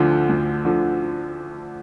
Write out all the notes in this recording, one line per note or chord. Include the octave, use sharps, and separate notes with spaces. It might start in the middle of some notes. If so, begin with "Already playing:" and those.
Already playing: D2 D3 F3
D2
D3 F3